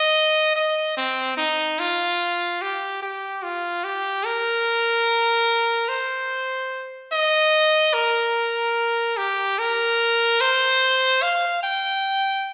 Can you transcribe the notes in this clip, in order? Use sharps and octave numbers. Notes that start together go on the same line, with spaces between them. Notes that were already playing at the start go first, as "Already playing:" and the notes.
Already playing: D#5
D#5
C4
D#4
F4
G4
G4
F4
G4
A#4
C5
D#5
A#4
G4
A#4
C5
F5
G5